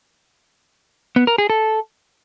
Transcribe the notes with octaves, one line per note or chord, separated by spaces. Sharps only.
B3
A#4
G#4
A4